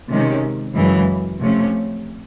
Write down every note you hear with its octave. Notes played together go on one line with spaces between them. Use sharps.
C3 D#3 G#3 C#4
F#2 C#3 E3 G#3
C3 F3 A3 C#4